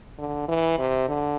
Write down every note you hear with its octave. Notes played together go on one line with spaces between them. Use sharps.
D3
E3
C3
D3